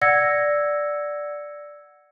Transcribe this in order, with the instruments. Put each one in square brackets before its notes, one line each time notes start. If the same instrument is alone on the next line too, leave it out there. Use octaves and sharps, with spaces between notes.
[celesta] D5 F#5 E6 G#6 A#6 C#7